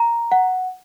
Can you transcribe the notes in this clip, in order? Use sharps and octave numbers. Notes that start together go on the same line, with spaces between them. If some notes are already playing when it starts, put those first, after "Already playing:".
Already playing: A#5
F#5